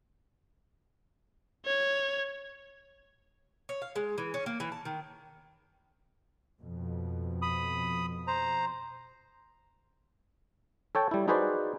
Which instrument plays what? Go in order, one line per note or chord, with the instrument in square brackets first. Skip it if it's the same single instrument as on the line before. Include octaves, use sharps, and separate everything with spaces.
[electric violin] C#5
[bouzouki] C#5
F5
G#3
E3
C#4
A#3
E3
A5
D#3
[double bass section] F2 B2
[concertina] B5 D#6
C5 A#5
[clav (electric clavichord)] A4 C#5 G5 A5
G3 E4
D#4 F#4 G#4 B4 C5 D5